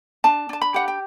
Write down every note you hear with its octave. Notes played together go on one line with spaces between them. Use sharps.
D4 A5
D4 A5
B5
G4 F#5
G5